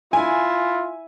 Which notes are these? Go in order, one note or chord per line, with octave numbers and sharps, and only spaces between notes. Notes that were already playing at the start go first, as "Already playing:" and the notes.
E4 F4 G#5